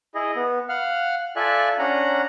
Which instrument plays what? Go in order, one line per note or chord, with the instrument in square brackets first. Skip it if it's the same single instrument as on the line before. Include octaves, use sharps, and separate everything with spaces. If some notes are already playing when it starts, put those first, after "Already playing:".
[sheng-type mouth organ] E4 G#4 D#5
B3
F5 F#5 F6
F4 A4 D5 E5 G#5 F#6
C#4 D4 F#5 A#5